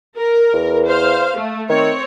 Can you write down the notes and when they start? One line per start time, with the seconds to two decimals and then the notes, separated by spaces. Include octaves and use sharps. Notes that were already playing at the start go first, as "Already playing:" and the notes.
0.17 A#4
0.53 E2
0.88 C5 F5
1.37 A3
1.70 D#3 C4 C#5